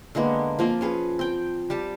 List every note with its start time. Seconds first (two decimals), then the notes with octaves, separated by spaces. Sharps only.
0.15 D3 G#3 A#3 B3
0.59 F3 A#3 C4 F4
0.81 C#4 G#4 B4
1.19 C4 G5
1.70 G3 G4 A5